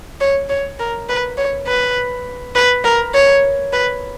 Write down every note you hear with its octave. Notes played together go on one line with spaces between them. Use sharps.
C#5
C#5
A#4
B4
C#5
B4
B4
A#4
C#5
B4